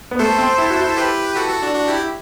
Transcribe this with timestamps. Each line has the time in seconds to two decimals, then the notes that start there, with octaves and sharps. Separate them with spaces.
0.11 B3
0.19 A3 A4 C5
0.39 C4
0.58 E4
0.70 F#4
0.81 E4
0.97 G4 B4
1.36 F#4 A4
1.49 F#4 A4
1.62 D4 F#4
1.75 D4 F#4
1.88 E4 G4